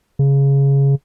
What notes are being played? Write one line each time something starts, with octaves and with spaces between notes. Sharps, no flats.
C#3